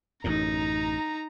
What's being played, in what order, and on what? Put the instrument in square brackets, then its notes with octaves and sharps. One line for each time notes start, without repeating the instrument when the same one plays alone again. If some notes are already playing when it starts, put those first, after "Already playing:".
[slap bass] A1 F#2 A2 [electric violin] D#4 A#5